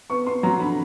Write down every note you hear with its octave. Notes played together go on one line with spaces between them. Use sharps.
B3 C#6
B3 C6
F#3 A#5
D3 B5